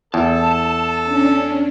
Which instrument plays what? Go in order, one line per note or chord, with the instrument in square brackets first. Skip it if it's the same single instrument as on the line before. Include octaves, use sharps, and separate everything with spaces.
[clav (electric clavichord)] E2 [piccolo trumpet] A4 [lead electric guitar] A5
[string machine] C#4 D4